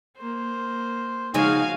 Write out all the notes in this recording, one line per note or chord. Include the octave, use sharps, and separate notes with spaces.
A#3 C5
C#3 F3 G#3 D#4 F#4 F5 G#5